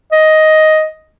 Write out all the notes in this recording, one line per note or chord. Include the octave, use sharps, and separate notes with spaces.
D#5